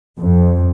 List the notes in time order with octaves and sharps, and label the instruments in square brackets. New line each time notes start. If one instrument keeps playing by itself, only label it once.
[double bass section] F2